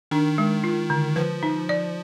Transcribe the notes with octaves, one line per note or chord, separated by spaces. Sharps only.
D#3 D4
G#3
F4
D3
F3 B4
D#4
D5